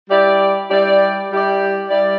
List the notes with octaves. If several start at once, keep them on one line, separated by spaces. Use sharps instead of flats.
G3 E4 G4 D5
G3 E4 G4 D5
G3 E4 G4 D5
G3 E4 G4 D5